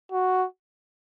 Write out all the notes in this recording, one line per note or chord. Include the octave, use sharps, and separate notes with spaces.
F#4